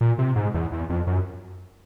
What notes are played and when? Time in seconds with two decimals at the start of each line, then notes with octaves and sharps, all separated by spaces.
0.01 A#2
0.18 C3
0.36 G#2
0.54 E2
0.72 E2
0.89 F2
1.07 F#2